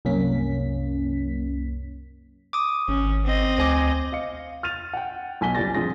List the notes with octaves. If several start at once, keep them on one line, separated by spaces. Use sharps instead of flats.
C2 F#2 A#3 C#4 B6
D6 D#6
G#1 C#4
C4 D#5
D2 C5 G#5 D6
D#5 F5 C#7
F6 A6 D#7 F7
F#5 G5
B1 G#5 B6 G7
F#1 C#2 G3 G#5 A6 A#6
A#1 C4 G#4 A#6